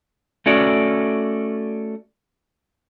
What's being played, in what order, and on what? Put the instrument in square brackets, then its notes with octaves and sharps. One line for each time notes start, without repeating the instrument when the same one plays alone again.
[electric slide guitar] A3 C#4 F#4 D5